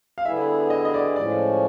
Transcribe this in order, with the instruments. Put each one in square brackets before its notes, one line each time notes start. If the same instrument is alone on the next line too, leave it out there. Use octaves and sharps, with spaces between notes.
[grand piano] F5
[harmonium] D3 G3 B3 E4 G#4 [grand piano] E5
[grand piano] D#5
D#5
D5
[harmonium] A2 F3 G#3 C#4 [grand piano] D5